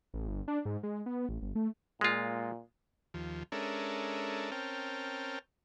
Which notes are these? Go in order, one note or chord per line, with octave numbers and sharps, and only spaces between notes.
A1
G1
D4
G#2
G#3
B3
A1
G1
A3
A#2 G#3 F4
D#2 F3
G#3 C#4 D4 A4 A#4 E5
C4 C#4 A#4 G5 A5 F6